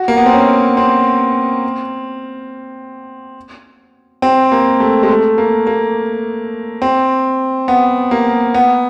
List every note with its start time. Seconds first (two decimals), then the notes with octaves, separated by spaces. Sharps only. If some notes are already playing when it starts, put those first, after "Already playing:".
Already playing: F#4
0.08 A#3
0.17 B3
0.26 C4
0.33 C#4
0.77 C4
4.22 C4
4.52 A#3
4.80 A3
5.03 G#3
5.09 A3
5.38 A#3
5.67 A#3
6.82 C4
7.68 B3
8.11 A#3
8.54 B3